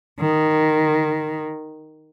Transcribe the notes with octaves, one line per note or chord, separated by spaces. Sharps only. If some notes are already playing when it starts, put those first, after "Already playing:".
D#3